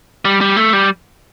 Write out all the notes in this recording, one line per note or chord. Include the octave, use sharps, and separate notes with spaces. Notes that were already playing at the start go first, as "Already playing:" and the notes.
G3
G3
A3
G3